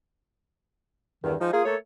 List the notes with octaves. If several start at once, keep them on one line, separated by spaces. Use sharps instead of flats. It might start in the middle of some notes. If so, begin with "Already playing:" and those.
E2 G2 D#3
F3 G#3 D#4
A#3 F4 G#4
A3 A#3 A4 C#5